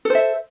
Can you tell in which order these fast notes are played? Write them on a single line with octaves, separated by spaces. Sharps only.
A4 C5 E5